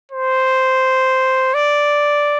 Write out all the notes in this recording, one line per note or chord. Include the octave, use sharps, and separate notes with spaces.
C5
D5